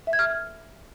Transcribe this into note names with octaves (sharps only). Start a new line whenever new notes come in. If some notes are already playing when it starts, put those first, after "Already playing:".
E5
G#6
F6